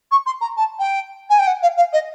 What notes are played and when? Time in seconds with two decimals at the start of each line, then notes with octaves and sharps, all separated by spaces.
0.11 C#6
0.26 C6
0.41 A#5
0.57 A5
0.79 G5
1.30 G#5
1.39 G5
1.47 F#5
1.62 F5
1.77 F5
1.93 D#5